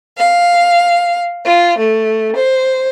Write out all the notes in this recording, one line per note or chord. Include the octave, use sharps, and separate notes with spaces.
F5
F4
A3
C5